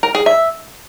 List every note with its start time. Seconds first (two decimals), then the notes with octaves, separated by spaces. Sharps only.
0.03 A#4
0.15 G#4
0.26 E5